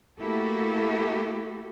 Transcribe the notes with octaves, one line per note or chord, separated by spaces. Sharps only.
A3 A#3 E4 F#4 G4 A4